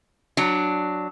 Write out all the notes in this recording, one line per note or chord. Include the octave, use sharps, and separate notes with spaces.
F#3 D4